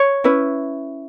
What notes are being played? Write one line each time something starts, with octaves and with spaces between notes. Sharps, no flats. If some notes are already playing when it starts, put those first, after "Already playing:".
Already playing: C#5
C#4 E4 B4